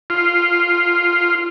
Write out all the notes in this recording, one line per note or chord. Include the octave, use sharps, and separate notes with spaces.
F4